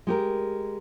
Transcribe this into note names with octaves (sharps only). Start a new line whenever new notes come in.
G#3 G4 A#4